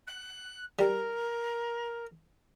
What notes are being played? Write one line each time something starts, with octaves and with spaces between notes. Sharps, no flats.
F#6
G3 A#4